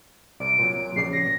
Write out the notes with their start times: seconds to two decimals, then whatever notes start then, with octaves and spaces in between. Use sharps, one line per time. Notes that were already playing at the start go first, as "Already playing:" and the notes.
0.40 C2 D5 D7
0.59 A#2 F#3
0.96 A#1 C#3 D5 C7
1.13 A#6